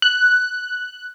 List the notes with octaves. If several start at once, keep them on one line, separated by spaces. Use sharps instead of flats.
F#6